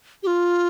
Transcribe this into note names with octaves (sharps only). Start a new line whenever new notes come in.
G4
F4